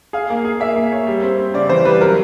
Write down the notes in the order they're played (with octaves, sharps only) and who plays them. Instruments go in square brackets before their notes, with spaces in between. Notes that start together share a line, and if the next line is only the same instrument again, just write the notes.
[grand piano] G#4 [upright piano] F5
[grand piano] A#3
G#4
[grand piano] A#3 [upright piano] E5
[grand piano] A#3
C#5
G3
C4
C4
[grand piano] C#3 [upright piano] D5
[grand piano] E3 [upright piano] C5
[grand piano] G3 [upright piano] B4
[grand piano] F#3 [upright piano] A#4